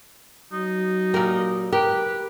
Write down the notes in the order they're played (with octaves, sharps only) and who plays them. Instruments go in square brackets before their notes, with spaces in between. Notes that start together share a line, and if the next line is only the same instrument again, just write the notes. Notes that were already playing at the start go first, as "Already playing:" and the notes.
[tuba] F#3 [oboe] D#4
[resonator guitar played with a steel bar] A#2 A#4 [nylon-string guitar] G4
[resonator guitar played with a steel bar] G4 [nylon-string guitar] A#4 [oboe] B4